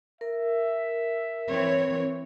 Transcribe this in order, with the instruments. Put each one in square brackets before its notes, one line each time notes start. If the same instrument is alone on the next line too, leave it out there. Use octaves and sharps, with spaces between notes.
[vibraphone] A#4 [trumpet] E5
[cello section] E3 C4 C#5